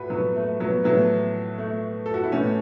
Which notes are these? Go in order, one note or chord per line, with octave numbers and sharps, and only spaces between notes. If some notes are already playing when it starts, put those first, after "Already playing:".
Already playing: A2 F#4 B4
F#3 B3
A3
F#3 B3
A2 E3 F#3 B3
A3
A4
F#4
E4
A2 E3 A3 C#4